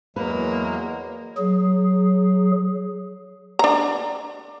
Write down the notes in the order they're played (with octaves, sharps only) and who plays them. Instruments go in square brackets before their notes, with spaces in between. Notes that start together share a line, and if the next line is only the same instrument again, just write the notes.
[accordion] E2 F#3 G#3 [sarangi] A#3 [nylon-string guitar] B4
[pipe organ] F#3 G#4
[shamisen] D4 A#5